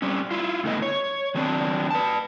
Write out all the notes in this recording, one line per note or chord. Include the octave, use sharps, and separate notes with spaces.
G3 C4 C#4
E4 F4
G2 D3 A3 B3 D#5
C#5
D#3 F#3 B3 C4 D4
B4 A5